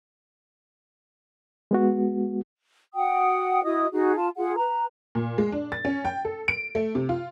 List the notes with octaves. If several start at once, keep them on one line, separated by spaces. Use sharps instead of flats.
G#3 B3 F#4
F#4 F#5 G5 D#6
E4 F#4 D#5 D#6
D#4 F#4 G#4
F4 A5
F4 G#4 F#5
B4 A#5
A#2
G#3
D4
A6
C#4
G5
A4
D7
A3
C3
F4